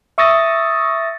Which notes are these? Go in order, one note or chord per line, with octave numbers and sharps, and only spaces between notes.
E5 C#6 D#6 E6 A6 A#6